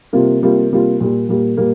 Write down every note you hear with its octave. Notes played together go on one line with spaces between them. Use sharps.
C3 G3 A#3 F4
C3 G3 A#3 F4
C3 G3 A#3 F4
A#2 G3 A#3
A#2 G3 A#3
A#2 G3 A#3